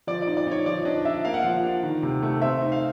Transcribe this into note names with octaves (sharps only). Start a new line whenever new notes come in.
F3 D5
D#4 D5
D5
D#4 C#5
F3 D5
D4 D#5
D4 E5
A#3 F5
F#5
F3 F5
D4
D#3
C3
A3
C4 E5
D#4
F5